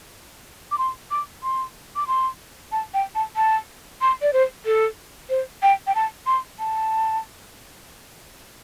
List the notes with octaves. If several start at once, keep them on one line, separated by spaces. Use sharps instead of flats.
D6
C6
D6
C6
D6
C6
A5
G5
A5
A5
C6
D5
C5
A4
C5
G5
G5
A5
C6
A5